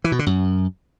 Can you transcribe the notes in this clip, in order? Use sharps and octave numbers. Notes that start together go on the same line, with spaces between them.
E3
B2
D3
F#2